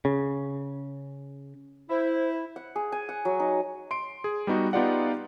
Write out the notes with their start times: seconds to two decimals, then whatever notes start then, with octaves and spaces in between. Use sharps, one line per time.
0.05 C#3
1.90 E4 C5
2.56 F#5
2.76 G#4
2.92 G#5
3.09 F#5
3.25 F#3
3.40 D#4
3.91 C6 D7
4.24 G#4
4.47 G3 B3 D#4 F#4
4.73 B3 D#4 F4 G4 D5 F#5